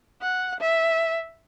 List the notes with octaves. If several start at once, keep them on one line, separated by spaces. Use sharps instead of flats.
F#5
E5